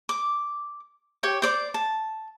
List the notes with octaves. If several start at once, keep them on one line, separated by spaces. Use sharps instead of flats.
D6
G4 C#5 G5
C5 D5 D6
A5